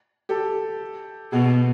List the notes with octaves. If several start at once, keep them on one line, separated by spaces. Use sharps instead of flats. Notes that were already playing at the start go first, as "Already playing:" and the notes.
G4 A4
B2 F#4 G#4